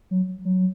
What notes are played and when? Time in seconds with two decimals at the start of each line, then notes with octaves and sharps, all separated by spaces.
0.11 F#3
0.45 F#3